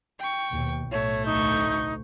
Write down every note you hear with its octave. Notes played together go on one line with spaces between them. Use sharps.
G5 C#6
D#2 B2
B1 A2 A3 C#5
D2 D#4 C#6 G6